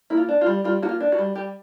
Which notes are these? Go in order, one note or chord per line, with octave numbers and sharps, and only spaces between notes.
A#3 E4
F4
D4
F4
G3
G3 F4
A#3 F#4
F4
D4
F#4
G3
G3 G4